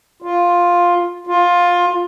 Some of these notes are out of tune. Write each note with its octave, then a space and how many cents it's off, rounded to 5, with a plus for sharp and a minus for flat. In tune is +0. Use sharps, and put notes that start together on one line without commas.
F4 +5
F4 +15